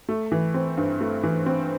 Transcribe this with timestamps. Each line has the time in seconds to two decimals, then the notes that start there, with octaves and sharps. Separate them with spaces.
0.09 A3
0.32 E3
0.54 C4
0.77 G2
1.00 A3
1.23 E3
1.46 C4